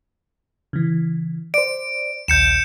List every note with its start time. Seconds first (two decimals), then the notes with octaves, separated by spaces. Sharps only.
0.73 C#3 E3
1.54 C5 D5 D7
2.28 A#1 D#2 G6 C#7 E7